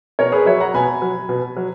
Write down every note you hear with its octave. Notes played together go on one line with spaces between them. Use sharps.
B2 A#4 C#5
G#4 B4
F#3 C#5 E5
F#5 A#5
B2 G#5 B5
F#3
B2
F#3